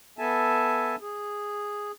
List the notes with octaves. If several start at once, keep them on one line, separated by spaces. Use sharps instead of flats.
B3 A4 E5 G#5 A5
G#4